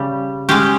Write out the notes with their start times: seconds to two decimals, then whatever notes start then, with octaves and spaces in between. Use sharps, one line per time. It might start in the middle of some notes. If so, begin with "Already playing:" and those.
Already playing: C#3 G3 G4
0.49 G#3 C#4 G4